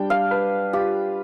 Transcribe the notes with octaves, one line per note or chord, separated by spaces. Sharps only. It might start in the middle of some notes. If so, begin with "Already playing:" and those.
Already playing: G3 D4 G5
F5
B4
F4 G4